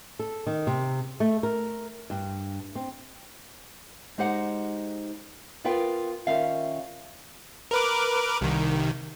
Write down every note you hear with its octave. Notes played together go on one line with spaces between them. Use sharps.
A4
D#3
C3
A3
A#4
G2
C4
G#3 D#4 G4 C5 F#5
B3 F4 A#4 B4 F5 G5
D#3 C#4 F4 E5 F5
A#4 B4 D6
C2 D#3